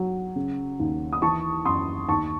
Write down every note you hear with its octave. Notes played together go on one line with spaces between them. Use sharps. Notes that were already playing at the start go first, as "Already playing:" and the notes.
Already playing: F#3
C#3
D#2
D#6
E3 A5 C#6
F#2 C6 D#6
D#2 A5 C#6